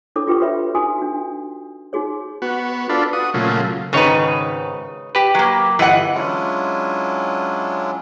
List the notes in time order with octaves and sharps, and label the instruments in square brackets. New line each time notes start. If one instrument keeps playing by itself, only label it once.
[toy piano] D4 E4 A4 C#5 D6
F4 G4 B4 G5 C#6
F#4 B4 C#5 E5 B5
D#4 F#4 G4 G#5 D#6
D4 F#4
D#4 F#4 G#4 C#5
[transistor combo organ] B3 F#4
D4 F4 A4 B4
F#4 D#6
A#2 C#3 F#3 A3 F4
[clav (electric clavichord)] G#1 C#5 [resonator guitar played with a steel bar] C#3 D#4 B4
[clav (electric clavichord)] G4 B4
[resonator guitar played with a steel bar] F#3 A#3
[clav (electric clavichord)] G1 E3 [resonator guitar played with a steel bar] B4 D#5 F#5
[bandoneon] F#3 G#3 C#4 D4 E4 F4